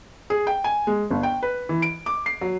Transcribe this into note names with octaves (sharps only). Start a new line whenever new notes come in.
G#4
G5
G#5
G#3
G1
G5
B4
E3
D7
D6
C7
F#3